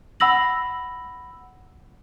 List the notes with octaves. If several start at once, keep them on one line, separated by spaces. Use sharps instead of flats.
F#5 B5 E6 A#6 F#7